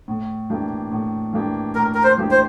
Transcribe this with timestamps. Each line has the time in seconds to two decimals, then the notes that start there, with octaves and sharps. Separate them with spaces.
0.08 A2
0.50 E3 A#3 D4 G4
0.92 A2
1.33 E3 A#3 D4 G4
1.75 A2 A#4
1.95 A#4
2.03 C5
2.18 E3 A#3 D4 G4
2.31 C5